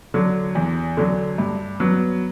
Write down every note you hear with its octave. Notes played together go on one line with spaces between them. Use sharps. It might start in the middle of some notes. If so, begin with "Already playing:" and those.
D3 F#3
E2
D3 F#3
G2
F#3 B3